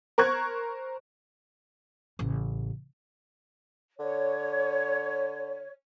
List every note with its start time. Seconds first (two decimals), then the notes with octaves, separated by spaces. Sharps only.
0.18 A#4 C5 C#6 F#6 G#6
2.19 A1 C#3
3.99 D3 C#5